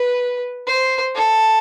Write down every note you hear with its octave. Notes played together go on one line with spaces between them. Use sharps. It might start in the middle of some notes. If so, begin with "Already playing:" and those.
Already playing: B4
C5
A4